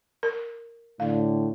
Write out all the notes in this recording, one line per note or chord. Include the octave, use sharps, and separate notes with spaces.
A#4
A2 D3 F5